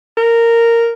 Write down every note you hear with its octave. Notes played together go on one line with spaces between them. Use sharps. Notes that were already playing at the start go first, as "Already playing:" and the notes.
A#4